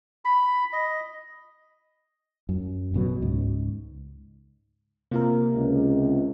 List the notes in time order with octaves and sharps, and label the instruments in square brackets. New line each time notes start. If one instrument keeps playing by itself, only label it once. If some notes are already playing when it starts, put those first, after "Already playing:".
[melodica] B5
D#5
[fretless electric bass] F#2
A1 B2 F#3
C#2 G#2
[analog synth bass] C3 [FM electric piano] A#3 F4 A#4
[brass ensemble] C#2